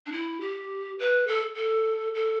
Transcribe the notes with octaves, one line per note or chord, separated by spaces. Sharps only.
D4
E4
G4
B4
A4
A4
A4